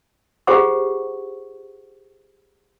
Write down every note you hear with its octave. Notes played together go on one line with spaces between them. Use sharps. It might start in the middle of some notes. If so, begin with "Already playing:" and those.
F4 G4 G#4 C5 F#5 C#6